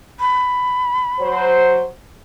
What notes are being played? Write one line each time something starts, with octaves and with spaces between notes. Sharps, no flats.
B5
F#3 C5